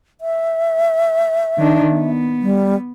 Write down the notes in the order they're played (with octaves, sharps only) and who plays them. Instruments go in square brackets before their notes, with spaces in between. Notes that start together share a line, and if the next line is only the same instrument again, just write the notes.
[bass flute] E5
[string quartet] D#3 D4
B3
[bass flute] G3